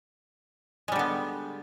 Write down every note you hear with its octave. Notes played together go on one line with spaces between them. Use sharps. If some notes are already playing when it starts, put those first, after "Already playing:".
D3 G3 G#3 B3